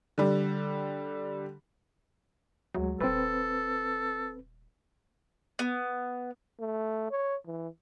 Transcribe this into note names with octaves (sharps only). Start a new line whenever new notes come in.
D3 G3
D2 F#3 G#3
D#1 C4 A4 B4
B3
A3
C#5
E3